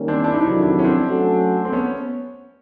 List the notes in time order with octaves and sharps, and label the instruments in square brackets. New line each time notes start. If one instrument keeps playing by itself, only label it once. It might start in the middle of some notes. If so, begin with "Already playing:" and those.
Already playing: [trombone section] D#3 G3 A#3 C#4
[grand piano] C4 D4
D4 E4
D#4
[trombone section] F2 C3 D#3 F#3 [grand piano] D4 E4
[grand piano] D4 E4
C#4
C4 D4
[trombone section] F#3 A3 C#4 F#4 A4
[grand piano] C4
B3 C#4